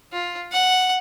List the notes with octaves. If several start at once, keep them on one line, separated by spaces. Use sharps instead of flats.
F4
F#5